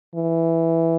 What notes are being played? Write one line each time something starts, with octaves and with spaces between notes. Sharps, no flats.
E3